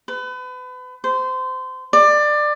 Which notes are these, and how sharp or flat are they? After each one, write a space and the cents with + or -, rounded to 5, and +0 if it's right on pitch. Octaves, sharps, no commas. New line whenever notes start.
B4 +35
C5 -25
D5 +20